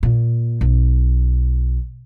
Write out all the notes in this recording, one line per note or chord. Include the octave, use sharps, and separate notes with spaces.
A#2
B1